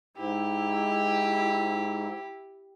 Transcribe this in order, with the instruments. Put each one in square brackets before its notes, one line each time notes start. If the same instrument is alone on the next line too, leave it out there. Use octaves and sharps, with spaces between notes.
[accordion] G#2 [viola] E4 [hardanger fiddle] G4